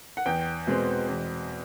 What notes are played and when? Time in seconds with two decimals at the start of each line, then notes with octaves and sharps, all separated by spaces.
0.17 F#5
0.26 E2 G5
0.67 B2 G#3 C4
1.09 E2